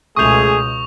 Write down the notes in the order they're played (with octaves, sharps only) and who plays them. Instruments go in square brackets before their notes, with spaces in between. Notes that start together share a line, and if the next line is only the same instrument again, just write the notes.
[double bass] C#2 B2 [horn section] A3 G#4 [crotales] C#6 F7 [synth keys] D#6 G6